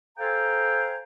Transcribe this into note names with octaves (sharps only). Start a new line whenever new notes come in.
A4 C5 F5 G5 G#5 A#5